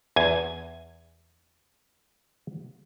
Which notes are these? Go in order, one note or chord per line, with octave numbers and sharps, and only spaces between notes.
E2 G#5